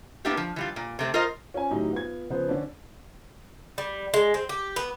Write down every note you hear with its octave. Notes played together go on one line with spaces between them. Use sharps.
A#3 B3 D4 E4 G4
F3
E3 G3 F4
A#2
C3 A3 C4
F4 A#4 C5 D#5
C#4 F4 G#5
A2 D#3 F#3 D#4 G4
B3 F4 G#6
C#3 F3 B3 B4 C5
D3 C#4 D4
G3
G#3
C4
G4
B3